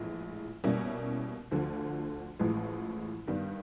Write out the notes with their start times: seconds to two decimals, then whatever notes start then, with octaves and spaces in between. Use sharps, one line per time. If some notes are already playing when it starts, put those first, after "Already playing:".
Already playing: A#1 A2 E3 G#3
0.64 B2 G3 A#3 C#4 E4
1.51 D2 D3 F3
2.39 A1 A2 F3 G#3
3.28 G2 D#3 G3 B3